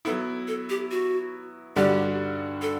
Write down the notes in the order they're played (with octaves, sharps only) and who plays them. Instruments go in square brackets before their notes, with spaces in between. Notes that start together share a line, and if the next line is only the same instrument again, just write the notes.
[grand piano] F#3 B3 E4 [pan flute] A4
[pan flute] A4
G4
F#4
[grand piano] G2 D3 G3 D4 F#4 [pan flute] G4
[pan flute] A4